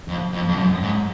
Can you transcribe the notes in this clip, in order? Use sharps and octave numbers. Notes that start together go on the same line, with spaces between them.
F2
F2
F2
F#2
G#2